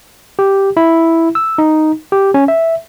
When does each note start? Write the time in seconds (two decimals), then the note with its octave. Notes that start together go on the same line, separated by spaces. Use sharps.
0.39 G4
0.77 E4
1.35 E6
1.58 D#4
2.12 G4
2.34 C#4
2.48 E5